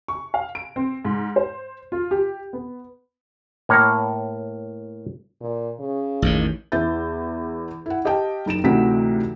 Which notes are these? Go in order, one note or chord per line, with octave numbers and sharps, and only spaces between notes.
C#6
F5
D7
C4
G#2
C5
F4
G4
B3
A2 A#3 C#5 F#5 A#5
A#2
C#3
A1 E2 D#3
E2 E4 E5 G6 A6
E4 F#5
G4 D#5 F5 G5 A5
F#1 D#4 D7 E7
D2 C3 E3 D#4 F#5 B6